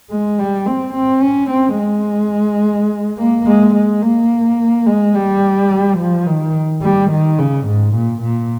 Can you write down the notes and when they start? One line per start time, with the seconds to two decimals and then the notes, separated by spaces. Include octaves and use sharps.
0.10 G#3
0.39 G3
0.66 C4
0.94 C4
1.22 C#4
1.50 C4
1.78 G#3
3.18 A#3
3.46 G#3
3.75 G#3
4.02 A#3
4.86 G#3
5.15 G3
5.98 F3
6.26 D#3
6.82 G3
7.11 D#3
7.39 C#3
7.67 G#2
7.95 A#2
8.22 A#2